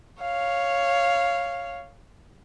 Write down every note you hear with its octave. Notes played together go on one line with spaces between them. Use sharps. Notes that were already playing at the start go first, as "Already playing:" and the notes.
C#5 F5